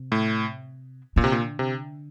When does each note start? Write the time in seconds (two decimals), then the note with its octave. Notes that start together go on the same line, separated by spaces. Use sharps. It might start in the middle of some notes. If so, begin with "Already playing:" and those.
Already playing: C3
0.12 A2
1.16 A#2 D3
1.24 C3
1.32 A#2
1.59 C3